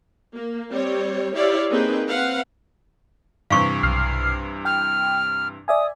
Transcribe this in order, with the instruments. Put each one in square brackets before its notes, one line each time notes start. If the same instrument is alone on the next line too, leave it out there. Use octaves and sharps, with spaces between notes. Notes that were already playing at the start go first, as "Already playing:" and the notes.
[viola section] A#3
G3 C4 C#5
E4 G4 C#5 D5 E5 F5
A#3 C4 D#4 G#4 B4 G5
C4 B4 F5 F#5
[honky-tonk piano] G2 C3 E3 [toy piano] F5 C#6
[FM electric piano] B1 F6 C7
[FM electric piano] G5 [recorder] F6
[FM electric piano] D5 E5 G#5 [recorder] D#6